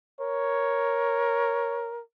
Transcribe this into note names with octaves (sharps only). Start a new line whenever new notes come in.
A#4 C#5